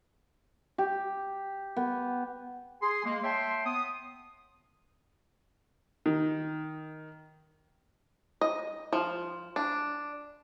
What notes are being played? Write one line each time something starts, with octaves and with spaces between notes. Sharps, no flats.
G4
B3
G#4 G#5 C6
G#3 A#3
C#5 E5 G5 A5 C6
B3 D#6
D#3
D#5
F3
D4